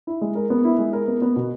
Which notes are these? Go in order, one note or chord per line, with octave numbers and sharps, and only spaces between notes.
E4
G#3
A#4
B3
E4
G#3
A#4
B3
B3
B2